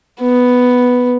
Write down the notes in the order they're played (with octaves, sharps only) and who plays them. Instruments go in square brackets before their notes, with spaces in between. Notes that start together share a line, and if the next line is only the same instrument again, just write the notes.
[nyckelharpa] B3